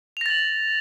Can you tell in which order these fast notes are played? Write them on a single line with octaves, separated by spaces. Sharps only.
F7 A#6 A6 F#7